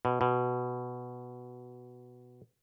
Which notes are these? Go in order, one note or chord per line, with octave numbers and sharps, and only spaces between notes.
B2
B2